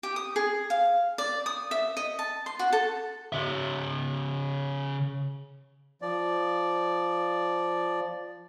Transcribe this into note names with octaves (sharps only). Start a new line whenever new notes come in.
G4
D#6
G#4
F5
D5
D#6
E5
D#5
A5
C6
F#4
A4
C#3 E5
F3 D5